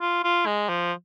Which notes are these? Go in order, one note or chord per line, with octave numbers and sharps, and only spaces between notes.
F4
F4
G#3
F3